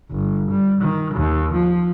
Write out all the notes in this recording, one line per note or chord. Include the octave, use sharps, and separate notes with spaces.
G1
G3
D#3
D#2
F3